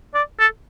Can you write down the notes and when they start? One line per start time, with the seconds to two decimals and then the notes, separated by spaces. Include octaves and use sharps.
0.15 D5
0.40 A4